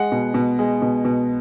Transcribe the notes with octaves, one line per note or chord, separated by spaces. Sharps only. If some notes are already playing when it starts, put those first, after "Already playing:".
Already playing: G#3 F#5
B2
B2
G#3
B2
B2